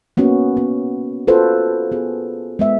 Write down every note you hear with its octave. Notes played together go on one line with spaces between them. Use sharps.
A#3 B3 C#4 F#4
B3
F4 F#4 A4 B4 C5
B3 G#4
G#3 B3 E5